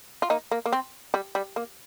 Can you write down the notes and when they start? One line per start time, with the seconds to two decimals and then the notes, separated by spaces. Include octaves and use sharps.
0.22 F4
0.30 A#3 D#4
0.51 A#3
0.66 A#3
0.73 C4
1.14 G3
1.35 G3
1.56 A#3